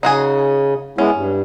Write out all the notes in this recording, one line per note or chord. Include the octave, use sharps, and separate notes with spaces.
C#3 D#4 F#4 G#4
G#3 B3 C#4 E4
G2